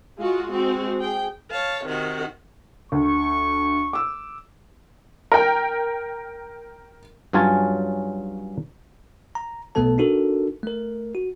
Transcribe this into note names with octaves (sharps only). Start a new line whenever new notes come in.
G#3 F4 F#4
G#3 C4 F#4
G#4 G5
C#5 F5 A5
C3 D#3 F#4
D2 C#6
D6 E6
A#4 G5
G2 F#3 C#4 F4 G#5 A5
A#5
B1 B2 A3 B3 A4 A5
D4 D#4 F#4 A4 A#4
A3 A#4
F#4